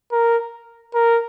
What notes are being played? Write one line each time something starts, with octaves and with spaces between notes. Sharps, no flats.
A#4
A#4